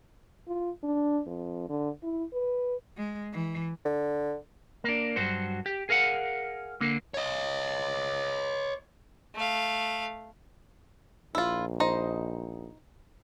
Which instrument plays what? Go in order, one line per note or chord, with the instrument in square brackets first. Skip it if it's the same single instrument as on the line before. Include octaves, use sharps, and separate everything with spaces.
[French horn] F4
D4
F2
D3
E4
B4
[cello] G#3
E3
[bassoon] D3
[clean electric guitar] A#3 D4
G2 F#3 F#4 C5
G4
G#4 A#4 F5 F#5
D3 A#3
[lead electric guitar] C#5 D#5
[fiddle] A3 F5
[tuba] A#1 [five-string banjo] E4 F4
[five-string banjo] D#4 C5 D#5